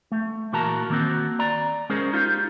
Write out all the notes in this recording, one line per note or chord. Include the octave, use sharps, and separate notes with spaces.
A3
A#2 E3 F#4 A#4 A5 A#5
D#3 A#3 C4 F#4
D5 A#5
G#3 C#4 G#4 A#4 C5
D#4 F4 G4 F5